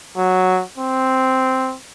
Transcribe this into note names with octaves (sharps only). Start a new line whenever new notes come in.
F#3
C4